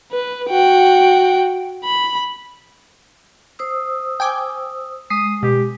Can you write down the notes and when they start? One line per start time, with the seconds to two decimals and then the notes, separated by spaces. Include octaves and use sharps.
0.12 B4
0.50 F#4 G5
1.84 B5
3.59 C5 D#6 E6
4.20 G5 G#5 D6
5.10 G#3 D#6 C7
5.43 B2 G4